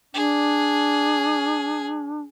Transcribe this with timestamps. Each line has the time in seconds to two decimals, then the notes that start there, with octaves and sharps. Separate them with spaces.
0.14 D4 G#4